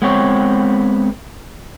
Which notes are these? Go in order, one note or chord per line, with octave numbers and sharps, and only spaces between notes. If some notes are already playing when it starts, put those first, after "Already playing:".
G#3 B3 C4 C#5